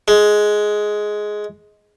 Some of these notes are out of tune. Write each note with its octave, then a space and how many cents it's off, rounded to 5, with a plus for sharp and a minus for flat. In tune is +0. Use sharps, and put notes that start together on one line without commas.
G#3 +10